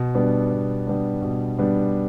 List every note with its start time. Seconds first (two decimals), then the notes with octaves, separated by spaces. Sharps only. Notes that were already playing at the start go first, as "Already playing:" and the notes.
Already playing: B2
0.15 G3 B3 D4
0.50 B2
0.87 G3 B3 D4
1.22 B2
1.59 G3 B3 D4